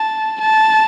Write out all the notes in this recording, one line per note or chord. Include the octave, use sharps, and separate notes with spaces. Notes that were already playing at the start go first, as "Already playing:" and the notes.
Already playing: A5
A5